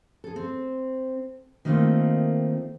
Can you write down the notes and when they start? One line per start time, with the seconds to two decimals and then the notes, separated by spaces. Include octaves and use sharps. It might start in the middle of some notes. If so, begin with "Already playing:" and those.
0.24 G#4 A4
0.36 C4
1.65 D#3 A3 A#3 C4 D#4 F4